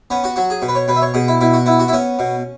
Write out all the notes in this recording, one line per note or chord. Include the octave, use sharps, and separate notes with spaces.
B3 C#4
F#4
F#3 F#4
G#4
B2
B4
C#5
B2 B4
E5
C#5
B2 G#4
E4
B2 E4
F#4
B3 E4
F#4
E4
B3 C#4
B2